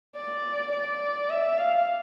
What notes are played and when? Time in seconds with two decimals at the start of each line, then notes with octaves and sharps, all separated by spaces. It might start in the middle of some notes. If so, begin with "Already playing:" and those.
0.16 D5
0.72 D5
1.30 E5
1.58 F5